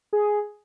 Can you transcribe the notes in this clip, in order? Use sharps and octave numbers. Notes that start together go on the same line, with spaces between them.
G#4